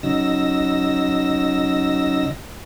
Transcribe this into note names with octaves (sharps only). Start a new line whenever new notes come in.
C#3 F#3 D#4 E6 A#6